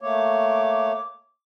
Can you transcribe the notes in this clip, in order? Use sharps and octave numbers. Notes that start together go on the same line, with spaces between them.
A3 A#3 C#5 D6